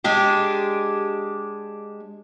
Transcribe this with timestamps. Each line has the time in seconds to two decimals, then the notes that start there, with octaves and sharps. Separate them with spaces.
0.04 G#3 D4 G4